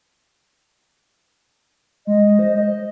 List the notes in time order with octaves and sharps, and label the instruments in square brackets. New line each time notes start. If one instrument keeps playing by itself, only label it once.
[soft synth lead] G#3 [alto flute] D#5
[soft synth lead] C5
D#5